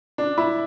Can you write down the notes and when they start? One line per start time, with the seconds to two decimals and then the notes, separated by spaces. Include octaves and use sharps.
0.18 D4
0.38 E4